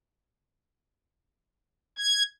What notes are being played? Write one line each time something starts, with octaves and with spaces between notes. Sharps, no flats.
G#6